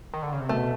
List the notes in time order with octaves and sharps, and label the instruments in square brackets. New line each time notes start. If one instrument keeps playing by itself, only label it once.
[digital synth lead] D#3
D3
C#3
C3
[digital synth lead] B2 [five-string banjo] A3